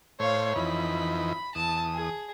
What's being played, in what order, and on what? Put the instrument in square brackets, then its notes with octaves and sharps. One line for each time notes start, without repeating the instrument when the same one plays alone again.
[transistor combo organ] A2 C5 [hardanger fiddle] C#5 F5
[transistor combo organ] F2 E3 D#4 [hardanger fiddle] B5
[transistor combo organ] E2 D#6 [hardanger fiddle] A5
[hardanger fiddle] G#4